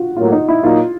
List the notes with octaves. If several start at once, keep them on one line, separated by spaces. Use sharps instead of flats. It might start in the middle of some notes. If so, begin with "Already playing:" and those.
Already playing: F4 F#4
A2 F#3 A#3 F4
D#4
E4
A#2 F#3 A#3 D#4 F4